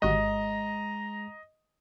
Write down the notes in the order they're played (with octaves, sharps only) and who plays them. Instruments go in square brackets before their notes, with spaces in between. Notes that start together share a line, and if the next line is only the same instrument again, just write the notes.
[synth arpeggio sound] G#1 F#4 G4 [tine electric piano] G#3 [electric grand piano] D#5 [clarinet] A#5